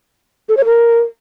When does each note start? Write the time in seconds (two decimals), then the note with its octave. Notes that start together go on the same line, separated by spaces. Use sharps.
0.49 A4
0.57 C#5
0.65 A#4